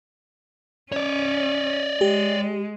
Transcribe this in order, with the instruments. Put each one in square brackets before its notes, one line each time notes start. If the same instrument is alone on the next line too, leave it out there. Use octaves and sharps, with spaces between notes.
[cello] C#4 [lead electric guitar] C#5 D5
[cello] G#3 [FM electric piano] G4